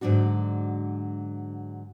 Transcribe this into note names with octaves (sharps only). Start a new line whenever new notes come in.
G#2 D3 F#3 D4 F#4